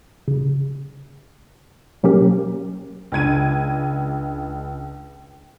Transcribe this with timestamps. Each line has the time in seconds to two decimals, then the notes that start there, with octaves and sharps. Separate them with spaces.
0.28 C#3
2.03 B2 F#3 A#3 C#4 G4 A#4
3.12 C#2 D4 G#6 D#7